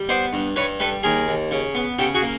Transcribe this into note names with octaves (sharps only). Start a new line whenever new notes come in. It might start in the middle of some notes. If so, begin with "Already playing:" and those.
Already playing: G3
B3 C5 D5
G2
G2 B4 C#5
G3 A4 B4
D#2 G#4 A#4
D#2
C#3
B3
C#3 G4 A4
F#4 G#4
A#3